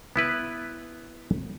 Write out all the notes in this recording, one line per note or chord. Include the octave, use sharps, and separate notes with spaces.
B3 E4 B4